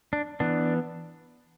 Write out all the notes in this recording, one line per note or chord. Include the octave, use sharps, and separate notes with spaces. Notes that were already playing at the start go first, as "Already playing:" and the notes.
D4
E3 B3 D4